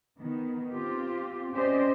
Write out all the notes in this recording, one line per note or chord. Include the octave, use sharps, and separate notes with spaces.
D#3 B3
C4 F4 G4
C#4 G4 C5 D5 D#5